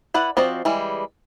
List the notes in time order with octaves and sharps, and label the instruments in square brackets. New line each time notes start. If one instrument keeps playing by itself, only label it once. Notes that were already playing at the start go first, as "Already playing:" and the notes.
[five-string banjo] E4 B4 D5 F#5
F3 C4 F#4 D5 D#5
E3 G3 G#3